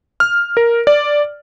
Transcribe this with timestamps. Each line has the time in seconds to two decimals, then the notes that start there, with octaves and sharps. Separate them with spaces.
0.20 F6
0.57 A#4
0.87 D5